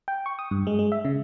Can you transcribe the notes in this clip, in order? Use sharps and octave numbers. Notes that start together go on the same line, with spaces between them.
G5
C#6
D#6
G2
G#3
G#3
E5
C#3